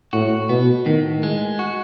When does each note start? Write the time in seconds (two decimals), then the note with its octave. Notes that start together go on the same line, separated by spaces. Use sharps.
0.13 A2 F#4
0.49 B2 B3
0.86 A2 D#3
1.23 G#3
1.59 F#4